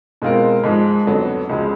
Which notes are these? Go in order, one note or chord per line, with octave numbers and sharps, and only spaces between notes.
B2 G#3 C4 F4 A#4
G#2 F3 G#3
F2 D3 F#3 B3
C#2 C#3 F3 G#3